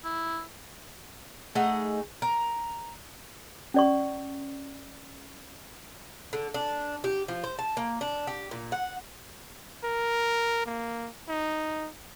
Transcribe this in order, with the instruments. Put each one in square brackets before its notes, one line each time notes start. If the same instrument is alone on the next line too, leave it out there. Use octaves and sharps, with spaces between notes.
[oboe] E4
[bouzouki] A3 D#4 G#4 F#5
A#4
[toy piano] C#4 D5 C#6
[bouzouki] D3
D4
G4
F3
C5
A5
A#3
D4
G4
A#2
F#5
[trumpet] A#4
A#3
D#4